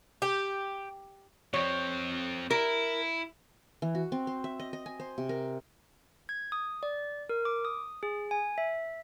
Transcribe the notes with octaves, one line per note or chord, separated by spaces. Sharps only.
G4
F2 C4 C#5
E4 A#4
E3
F#4
C4
C5
E5
D#5
D#5
G#5
C5
C3
A#4
G#6
D#6
D5
A#4
D6
D#6
G#4
G#5
E5